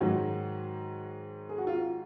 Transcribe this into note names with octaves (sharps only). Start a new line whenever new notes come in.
G#2 D#3 F#3 F#4
G#4
F#4
F4
F#4